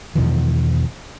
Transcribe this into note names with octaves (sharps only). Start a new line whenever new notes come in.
E2 B2 D#3 F3